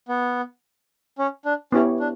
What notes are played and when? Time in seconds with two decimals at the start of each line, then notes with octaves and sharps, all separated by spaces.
0.08 B3
1.19 C#4
1.45 D4
1.72 B3 C#4 E4 G4 C#5
2.00 D4